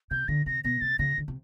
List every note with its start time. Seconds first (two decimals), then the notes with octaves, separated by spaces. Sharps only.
0.11 C3 G6
0.28 D3 A#6
0.46 C3 A#6
0.64 B2 A#6
0.81 C3 A6
0.99 C#3 A#6
1.18 D3
1.28 C3